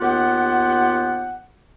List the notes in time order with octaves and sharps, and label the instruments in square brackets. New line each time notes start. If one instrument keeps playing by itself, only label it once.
[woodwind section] D#2 B3 F4 G4 F#5